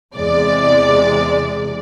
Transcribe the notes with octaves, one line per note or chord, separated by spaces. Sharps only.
E2 C3 G#3 D5